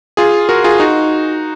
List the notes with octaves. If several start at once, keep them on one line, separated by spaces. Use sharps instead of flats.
F4 G#4
F#4 A#4
F4 G#4
D#4 F#4